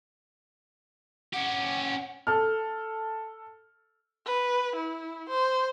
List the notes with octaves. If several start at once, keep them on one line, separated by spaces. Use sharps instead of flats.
C#4 G4 F#5
A4 F6
B4
E4
C5